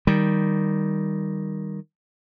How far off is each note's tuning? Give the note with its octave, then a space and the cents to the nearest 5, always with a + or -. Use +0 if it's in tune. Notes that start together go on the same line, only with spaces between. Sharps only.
D#3 +0 G3 +5